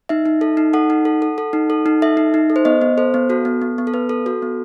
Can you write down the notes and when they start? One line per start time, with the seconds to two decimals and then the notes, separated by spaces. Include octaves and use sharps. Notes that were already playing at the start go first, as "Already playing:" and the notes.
0.09 D#4 E5
0.25 D#4
0.41 A4
0.57 D#4
0.73 A4 F#5
0.90 D#4
1.05 A4
1.22 A4
1.38 A4
1.53 D#4
1.70 A4
1.86 D#4
2.02 A4 E5
2.17 D#4
2.34 D#4
2.50 A4
2.56 C5
2.65 B3 D#5
2.81 B3
2.98 A4 C5
3.14 B3
3.30 F#4 A4
3.45 B3
3.62 B3
3.78 B3
3.87 A4
3.93 B3 B4
4.09 A4
4.26 F#4 A4
4.42 B3